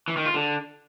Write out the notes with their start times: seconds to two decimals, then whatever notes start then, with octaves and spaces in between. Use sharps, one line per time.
0.08 E3
0.17 D#3
0.25 F4
0.34 D3